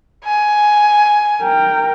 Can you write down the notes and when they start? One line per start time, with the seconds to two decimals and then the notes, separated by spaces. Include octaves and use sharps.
0.25 G#5
1.41 A#4 G5